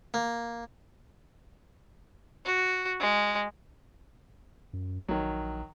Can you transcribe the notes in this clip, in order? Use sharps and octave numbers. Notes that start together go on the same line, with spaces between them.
A#3
F#4
G#3
F#2
A#1 D#3 F#3